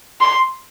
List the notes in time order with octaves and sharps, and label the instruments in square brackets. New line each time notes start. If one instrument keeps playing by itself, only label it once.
[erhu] C6